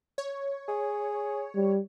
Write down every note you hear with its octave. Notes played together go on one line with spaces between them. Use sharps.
C#5
G#4
G3